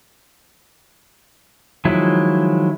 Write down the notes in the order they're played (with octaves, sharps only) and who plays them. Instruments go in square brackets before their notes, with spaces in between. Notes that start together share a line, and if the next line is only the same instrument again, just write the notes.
[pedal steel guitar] D#3 F3 F#3 G#3 E4